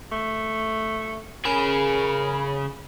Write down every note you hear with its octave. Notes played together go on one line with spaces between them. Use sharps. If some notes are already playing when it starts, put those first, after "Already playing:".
A3
C#3 G#4 A#4 B5